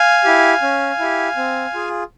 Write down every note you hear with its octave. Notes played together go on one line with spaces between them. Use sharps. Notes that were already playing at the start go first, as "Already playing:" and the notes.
Already playing: F5 G#5
E4 G4
C#4
E4 G4
C4
F4 G#4